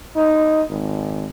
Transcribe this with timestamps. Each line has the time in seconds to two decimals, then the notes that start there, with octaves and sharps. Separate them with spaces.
0.16 D#4
0.70 G#1